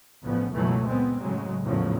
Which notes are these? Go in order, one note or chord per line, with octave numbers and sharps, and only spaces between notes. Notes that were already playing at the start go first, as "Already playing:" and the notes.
A1 C#3 F3 B3
C#2 F#2 B2 E3 F#3 A3
A#2 G#3 B3 C4
A2 C#3 F#3 G#3
A#1 E2 A2 C#3 F3 F#3